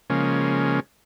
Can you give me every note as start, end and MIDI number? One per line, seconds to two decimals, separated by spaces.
0.10 0.80 49
0.10 0.80 53
0.10 0.80 56
0.10 0.80 58
0.10 0.80 61